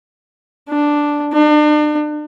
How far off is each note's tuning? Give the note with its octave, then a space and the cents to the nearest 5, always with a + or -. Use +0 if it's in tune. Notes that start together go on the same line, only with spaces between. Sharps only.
D4 +0
D4 +40